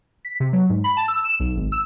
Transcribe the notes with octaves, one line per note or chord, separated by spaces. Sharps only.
B6
C3
F#3
G#2
B5
A5
E6
E7
B1
G#1
E6